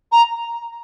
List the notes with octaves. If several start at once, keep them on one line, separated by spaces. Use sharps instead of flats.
A#5